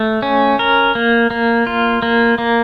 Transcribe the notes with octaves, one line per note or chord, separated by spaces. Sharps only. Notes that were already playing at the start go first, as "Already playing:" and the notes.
Already playing: A3
C#4
A#4
A#3
A#3
F4
A#3
A#3